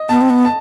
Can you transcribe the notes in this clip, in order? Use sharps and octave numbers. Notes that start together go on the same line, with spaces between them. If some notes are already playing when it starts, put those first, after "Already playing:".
Already playing: D#5
B3 A5
C4
B3
A5